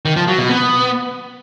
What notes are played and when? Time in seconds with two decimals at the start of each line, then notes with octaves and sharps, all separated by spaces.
0.05 D#3
0.16 F3
0.27 F#3
0.38 B2
0.49 B3